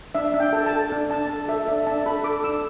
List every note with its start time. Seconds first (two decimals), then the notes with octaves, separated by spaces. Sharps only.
0.15 D4 E5
0.34 D4
0.40 G5
0.53 A4
0.66 A5
0.73 A4
0.92 D4
1.10 D4 A5
1.29 A4 A5
1.48 A4 E5
1.68 D4 E5
1.87 D4 A5
2.06 A4 B5
2.24 A4 D6
2.44 D4 E6